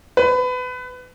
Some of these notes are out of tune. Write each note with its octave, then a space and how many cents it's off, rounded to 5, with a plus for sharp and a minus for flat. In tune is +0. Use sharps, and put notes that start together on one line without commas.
B4 +25